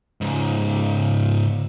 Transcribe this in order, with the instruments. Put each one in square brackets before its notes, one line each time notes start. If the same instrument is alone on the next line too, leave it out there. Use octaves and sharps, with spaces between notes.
[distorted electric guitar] C#2 G#2